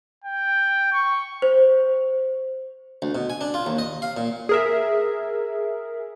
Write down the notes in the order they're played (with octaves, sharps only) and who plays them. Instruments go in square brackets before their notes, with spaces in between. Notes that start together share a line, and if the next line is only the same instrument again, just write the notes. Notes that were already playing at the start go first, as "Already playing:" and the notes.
[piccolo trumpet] G5
C#6
[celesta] C5
[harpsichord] D2
B2
G#5
D4
F4
D#2
D#5
F5
A#2
[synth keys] G#4 A#4 E5